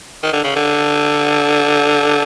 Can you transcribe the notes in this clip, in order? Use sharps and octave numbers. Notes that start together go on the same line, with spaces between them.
D#3
D3
C#3
D3